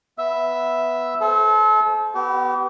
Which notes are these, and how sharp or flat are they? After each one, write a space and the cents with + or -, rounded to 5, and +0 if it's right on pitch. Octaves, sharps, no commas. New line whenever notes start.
B3 +0 E5 +0
A4 -35 C5 +0
B3 +0 G4 -40